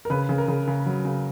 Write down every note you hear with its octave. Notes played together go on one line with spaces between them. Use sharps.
A#4
C#3 B4
C#3
A#4
C#3
C#3
F#3
C#3